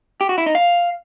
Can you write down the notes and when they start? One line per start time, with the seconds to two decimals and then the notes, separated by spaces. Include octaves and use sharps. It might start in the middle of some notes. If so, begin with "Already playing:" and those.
0.21 G4
0.29 F#4
0.38 E4
0.46 D#4
0.55 F5